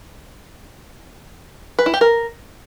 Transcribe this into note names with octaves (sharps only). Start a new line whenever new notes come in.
B4
E4
G4
A#4